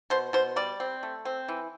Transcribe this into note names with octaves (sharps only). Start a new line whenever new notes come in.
B2 C5
B2 C5
G3 D5
C4
A3
C4
E3